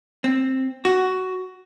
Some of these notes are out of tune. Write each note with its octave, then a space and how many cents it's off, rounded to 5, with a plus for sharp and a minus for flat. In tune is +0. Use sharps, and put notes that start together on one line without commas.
C4 +10
F#4 +10